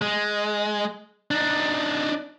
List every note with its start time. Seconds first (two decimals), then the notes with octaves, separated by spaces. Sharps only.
0.02 G#3
1.31 D4 D#4